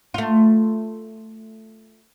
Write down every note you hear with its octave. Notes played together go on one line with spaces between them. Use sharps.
A3 F4